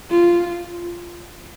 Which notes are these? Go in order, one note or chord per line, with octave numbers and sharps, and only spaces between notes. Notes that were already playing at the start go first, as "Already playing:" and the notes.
F4